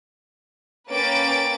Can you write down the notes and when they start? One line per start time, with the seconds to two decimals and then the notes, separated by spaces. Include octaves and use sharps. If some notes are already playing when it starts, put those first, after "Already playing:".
0.90 A#3 C#4 B4 G5 A6 D7